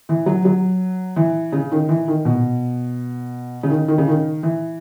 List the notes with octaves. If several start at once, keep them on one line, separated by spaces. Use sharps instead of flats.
E3
F#3
F#3
E3
C#3
D#3
E3
D#3
B2
C#3
D#3
D#3
C#3
D#3
E3